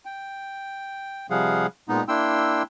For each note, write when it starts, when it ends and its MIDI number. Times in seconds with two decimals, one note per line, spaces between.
0.05 1.27 79
1.30 1.66 48
1.30 1.66 53
1.30 1.66 55
1.30 1.66 68
1.30 1.66 77
1.30 1.66 78
1.89 2.04 46
1.89 2.04 56
1.89 2.04 59
1.89 2.04 63
2.08 2.63 58
2.08 2.63 62
2.08 2.63 64
2.08 2.63 79
2.08 2.63 84
2.08 2.63 88